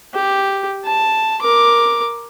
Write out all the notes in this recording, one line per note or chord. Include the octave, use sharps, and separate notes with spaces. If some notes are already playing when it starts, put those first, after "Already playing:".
G4
A5
A#4 D6